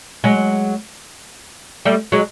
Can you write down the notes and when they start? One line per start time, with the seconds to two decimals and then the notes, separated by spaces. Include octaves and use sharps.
0.24 F#3 G#3
1.85 G3 A3
2.12 F#3 G#3